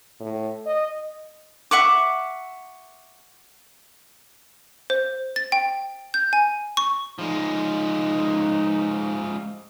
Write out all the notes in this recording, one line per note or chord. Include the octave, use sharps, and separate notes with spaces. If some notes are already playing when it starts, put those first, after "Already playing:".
A2
D#5
E5 F#5 C#6 D6
C5
A6
G5
G6
G#5
C#6
F3 G#3 D#4